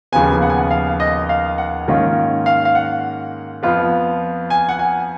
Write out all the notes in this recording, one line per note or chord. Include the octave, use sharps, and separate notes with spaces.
D#2 C#3 F3 B3 G#5
F#5
G#5
F#5
F5
D#5
F5
F#5
G#2 D#3 A#3 C#4 F4
F5
F5
F#5
F2 F3 B3 F4
G#5
F#5
G#5